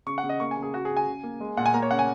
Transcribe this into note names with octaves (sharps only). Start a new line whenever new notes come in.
C#3 C#6
F#5
C#3
D#5
A#3 C#6
G#5
C#3
G#4
C#3 F#4
G#4
C#3
G#5
C#3
A#3
G#3
A#2 F#5
G#5
A#3 A#5
C#5
C#3 F#5
G#5